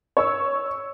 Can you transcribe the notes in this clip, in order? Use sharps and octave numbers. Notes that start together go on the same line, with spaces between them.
C#5 E6